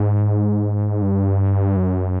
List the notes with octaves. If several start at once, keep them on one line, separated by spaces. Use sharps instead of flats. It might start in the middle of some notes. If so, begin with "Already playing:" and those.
Already playing: G#2
G2
F#2